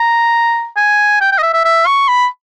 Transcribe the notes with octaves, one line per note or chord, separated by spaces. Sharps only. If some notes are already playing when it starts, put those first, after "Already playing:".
Already playing: A#5
G#5
G5
G5
D#5
E5
E5
E5
C#6
B5